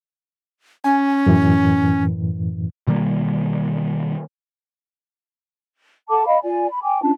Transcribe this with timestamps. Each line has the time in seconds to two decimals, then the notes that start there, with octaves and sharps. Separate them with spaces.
0.84 C#4 G#5
1.26 F#2 A2 E3
2.87 B2 D#3 G3 A#3
6.10 A4 F#5 A5 D6
6.26 D#5 F5 B5
6.43 F4 D5 G#5
6.69 B5
6.82 G5 G#5 D6
7.02 C#4 D4 F4 A5